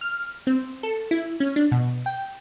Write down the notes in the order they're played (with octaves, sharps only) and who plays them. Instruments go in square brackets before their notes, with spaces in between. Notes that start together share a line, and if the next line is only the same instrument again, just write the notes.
[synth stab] F6
C4
A4
E4
C#4
D4
B2
G5